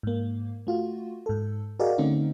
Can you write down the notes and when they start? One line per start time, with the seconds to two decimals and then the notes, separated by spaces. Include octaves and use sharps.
0.03 G#2 A#3
0.67 A3 F4 F#4
1.26 G#2 A4
1.80 F#4 G#4 A#4 D5 D#5 F5
1.98 D3 A3 C4 C#4 D#4